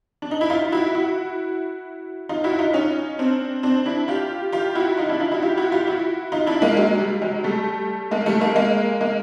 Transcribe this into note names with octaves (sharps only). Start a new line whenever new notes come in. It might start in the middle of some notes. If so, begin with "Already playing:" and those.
D4
D#4
E4
D#4 F4
F4
E4 F#4
E4 F#4
D#4 F4
E4 F#4
D#4 F4
C#4 D#4
C4 D4
C4 D4
D4 E4
F4 G4
F4 G4
E4 F#4
D#4 F4
D4 E4
D#4 F4
E4 F#4
F4 G4
E4 F#4
F4 G4
E4 F#4
D#4 F4
D4 E4
G#3 A#3
F#3 G#3
G3
F#3 G#3
G3 A3
G#3 A#3
G3 A3
G#3 A#3
G#3 A#3
G#3 A#3